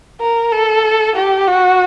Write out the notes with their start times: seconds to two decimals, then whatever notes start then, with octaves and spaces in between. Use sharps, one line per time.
0.21 A#4
0.52 A4
1.16 G4
1.48 F#4